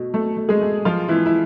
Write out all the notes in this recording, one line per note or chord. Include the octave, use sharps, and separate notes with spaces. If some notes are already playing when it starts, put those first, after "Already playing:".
Already playing: B2 A3
B2 A3 A4
A3
G#3 G#4
A3
F3 G#3 F4
E3 G#3 E4
E4